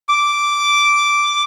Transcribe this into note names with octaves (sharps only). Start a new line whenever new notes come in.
D6